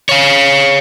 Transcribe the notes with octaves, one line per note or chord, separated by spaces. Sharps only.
C#5 F5